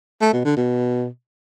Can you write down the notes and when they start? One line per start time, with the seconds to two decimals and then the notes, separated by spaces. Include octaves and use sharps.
0.21 A3
0.33 B2
0.45 D3
0.57 B2